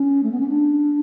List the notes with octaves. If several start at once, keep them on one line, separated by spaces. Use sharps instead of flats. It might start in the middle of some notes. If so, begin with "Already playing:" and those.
Already playing: C#4
A3
B3
C#4
D4